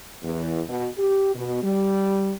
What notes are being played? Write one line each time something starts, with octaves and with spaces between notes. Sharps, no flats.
E2
B2
G4
B2
G3